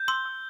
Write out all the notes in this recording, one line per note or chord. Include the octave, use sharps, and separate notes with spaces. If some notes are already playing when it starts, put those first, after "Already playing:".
Already playing: G6
C6 E6 G7
E6